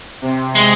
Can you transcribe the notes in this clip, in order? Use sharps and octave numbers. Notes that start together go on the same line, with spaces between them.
C3
G#3